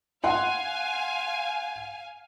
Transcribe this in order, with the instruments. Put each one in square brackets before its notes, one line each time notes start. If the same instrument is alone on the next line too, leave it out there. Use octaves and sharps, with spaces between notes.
[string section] F5 G#5 [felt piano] F#5 C6